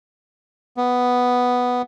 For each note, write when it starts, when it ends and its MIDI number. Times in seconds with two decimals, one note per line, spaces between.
0.77 1.82 59